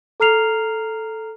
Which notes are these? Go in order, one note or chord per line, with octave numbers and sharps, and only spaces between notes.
A4 A#5 F6 C7 F7